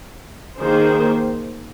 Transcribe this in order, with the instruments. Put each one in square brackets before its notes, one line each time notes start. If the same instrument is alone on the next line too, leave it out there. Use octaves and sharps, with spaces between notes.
[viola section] D#3 A#3 G#4 C5